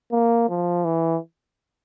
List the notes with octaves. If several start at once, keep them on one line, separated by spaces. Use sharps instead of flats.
A#3
F3
E3